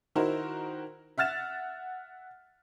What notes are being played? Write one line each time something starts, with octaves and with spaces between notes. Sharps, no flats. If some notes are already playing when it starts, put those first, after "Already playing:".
D#3 D#4 E4 F#4 A#4 C5
E5 F#5 F6 A6 E7